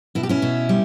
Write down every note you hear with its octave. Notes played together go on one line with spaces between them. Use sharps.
B2 E4
G4
C#4 E4
B2
G3